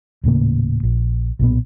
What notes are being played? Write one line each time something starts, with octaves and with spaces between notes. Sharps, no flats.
D#1 A2 C#3 A#3
A#1
B1 A#2 B3